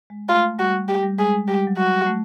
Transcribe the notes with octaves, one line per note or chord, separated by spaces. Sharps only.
G#3
A3 F4
G3 F#4
G4
G3
G#3 G#4
G#3
G3 G4
F#3
F#4
A3